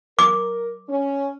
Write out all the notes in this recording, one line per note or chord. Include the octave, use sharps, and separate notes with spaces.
A#4 D6
C#4